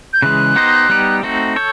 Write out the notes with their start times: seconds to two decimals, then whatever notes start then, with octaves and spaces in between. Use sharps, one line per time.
0.13 G6
0.22 C#3 E3 G#3 F#6
0.55 B3 D#4 G4 C5 D#5
0.89 G3 B3 D#4 G4
1.23 A3 C4 D#4 F#4
1.56 A4 C#5 G6